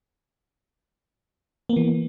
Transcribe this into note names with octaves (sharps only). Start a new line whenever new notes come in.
E3 A#3 B3